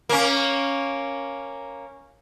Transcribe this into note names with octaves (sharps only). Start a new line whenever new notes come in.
A#3 C#4